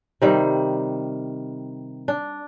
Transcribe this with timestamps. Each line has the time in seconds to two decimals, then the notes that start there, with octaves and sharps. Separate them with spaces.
0.22 C3 D#3 G3
2.08 D4